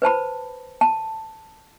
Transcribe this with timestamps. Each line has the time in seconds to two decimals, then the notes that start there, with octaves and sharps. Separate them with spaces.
0.02 B4 C5 A5 B5
0.81 A5